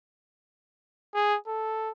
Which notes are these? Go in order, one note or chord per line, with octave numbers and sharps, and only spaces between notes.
G#4
A4